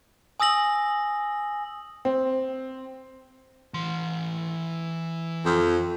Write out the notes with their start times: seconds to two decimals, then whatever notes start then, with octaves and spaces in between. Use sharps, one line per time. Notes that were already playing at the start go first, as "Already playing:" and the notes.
0.40 G#5 D#6 E6 A#6 F#7
2.05 C4
3.74 E3 C6
5.45 F2